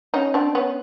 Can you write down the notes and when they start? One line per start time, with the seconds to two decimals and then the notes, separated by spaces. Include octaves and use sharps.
0.14 C#4 D#4
0.34 C4 D4
0.55 B3 C#4